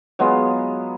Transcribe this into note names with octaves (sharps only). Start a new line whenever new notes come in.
F#3 G#3 B3 F4